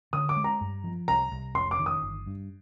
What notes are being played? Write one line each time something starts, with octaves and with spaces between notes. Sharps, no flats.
D3 D#6
D6
G#3
A#5
G2
F3
C2 A#5
C2
F1 C6
D6
D#3
D#6
G1
G2